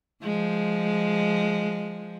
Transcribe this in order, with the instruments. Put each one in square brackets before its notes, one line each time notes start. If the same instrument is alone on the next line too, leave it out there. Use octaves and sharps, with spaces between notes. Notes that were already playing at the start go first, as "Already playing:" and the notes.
[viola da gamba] F3 G#3